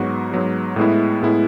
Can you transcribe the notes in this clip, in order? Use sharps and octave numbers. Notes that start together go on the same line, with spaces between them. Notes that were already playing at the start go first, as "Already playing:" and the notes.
Already playing: G#2 F#3 B3 F#4
G#2 F#3 B3 F#4
A2 G#3 B3 E4
A2 G#3 B3 E4